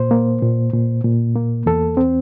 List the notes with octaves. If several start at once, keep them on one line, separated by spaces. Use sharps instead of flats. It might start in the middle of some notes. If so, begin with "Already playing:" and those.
Already playing: A#2 C5
A#3
A#2
A#2
A#2
A#3
E2 A4
C4